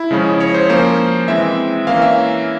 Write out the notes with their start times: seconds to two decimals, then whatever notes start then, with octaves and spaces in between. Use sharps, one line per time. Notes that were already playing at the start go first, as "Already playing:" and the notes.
Already playing: E4
0.11 C#3 F3 G#3 C#4
0.40 C#5
0.54 C5
0.69 F3 A#3 C#4 C5
1.28 E3 G#3 C4 E5
1.87 E3 A#3 C#4 F5
2.02 E5